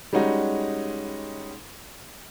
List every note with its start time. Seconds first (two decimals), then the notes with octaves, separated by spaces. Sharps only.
0.13 G3 G#3 C#4 D#4 F#4